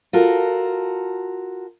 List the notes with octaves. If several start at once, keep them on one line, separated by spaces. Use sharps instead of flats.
F4 F#4 A4 A#4